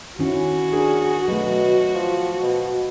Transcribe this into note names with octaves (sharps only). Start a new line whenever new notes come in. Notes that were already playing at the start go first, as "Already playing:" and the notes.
D#3 C#4 E4 F#4
D4 G#4 A#4
B2 F#3 A3
F3
B2